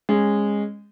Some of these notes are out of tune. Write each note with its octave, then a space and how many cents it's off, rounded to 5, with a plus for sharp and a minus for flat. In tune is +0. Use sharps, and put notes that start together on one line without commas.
G#3 -15 C#4 -20